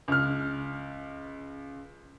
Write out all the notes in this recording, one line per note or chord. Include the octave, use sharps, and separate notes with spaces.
C#2 F6